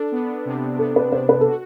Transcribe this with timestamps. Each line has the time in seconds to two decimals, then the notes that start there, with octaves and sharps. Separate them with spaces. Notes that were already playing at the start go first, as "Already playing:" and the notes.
Already playing: D4 A4
0.12 B3
0.45 C3
0.79 B3 A4
0.96 B4
1.12 D4 C5
1.29 B4
1.41 A4
1.46 F#4